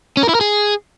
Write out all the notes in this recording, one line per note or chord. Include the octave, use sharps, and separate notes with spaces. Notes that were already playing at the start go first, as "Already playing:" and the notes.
C#4
A#4
E4
A#4
G#4